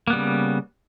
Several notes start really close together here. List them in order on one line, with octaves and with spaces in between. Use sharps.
A#3 B3 G3 C#3